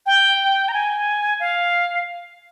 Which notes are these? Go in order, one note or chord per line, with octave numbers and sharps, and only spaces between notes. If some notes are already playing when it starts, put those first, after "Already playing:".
G5
A#5
G#5
F5